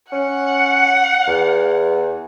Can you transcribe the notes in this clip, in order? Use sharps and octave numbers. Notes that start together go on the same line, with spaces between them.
C#4 F#5
E2